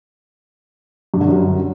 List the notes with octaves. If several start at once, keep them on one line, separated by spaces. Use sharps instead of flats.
G2
D3
F#2